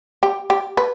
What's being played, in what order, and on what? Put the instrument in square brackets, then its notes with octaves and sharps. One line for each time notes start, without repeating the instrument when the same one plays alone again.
[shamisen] G4
G4
B4